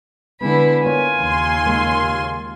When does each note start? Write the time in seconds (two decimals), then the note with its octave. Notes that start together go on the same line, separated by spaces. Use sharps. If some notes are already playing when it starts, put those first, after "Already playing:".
0.41 B2 D3 G#3 B3 E4 B5
0.84 B3 F4 A#4 C#5 G#5
1.20 D#2 C#3 C6
1.66 C#3 G#3 A#3